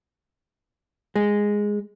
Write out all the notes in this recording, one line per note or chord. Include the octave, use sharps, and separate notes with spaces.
G#3